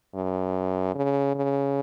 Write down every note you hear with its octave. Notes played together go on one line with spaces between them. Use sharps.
F#2
C#3
C#3